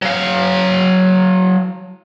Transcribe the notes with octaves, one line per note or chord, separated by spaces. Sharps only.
F#3 F5